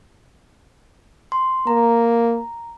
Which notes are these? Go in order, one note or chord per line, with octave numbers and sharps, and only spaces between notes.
C6
A#3 A#5